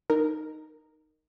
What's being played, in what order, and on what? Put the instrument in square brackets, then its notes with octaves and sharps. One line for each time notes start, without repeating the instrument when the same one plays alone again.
[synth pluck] D#4 A#4